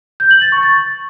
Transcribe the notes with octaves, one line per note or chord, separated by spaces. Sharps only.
G6
F#7
A6
C#6
A6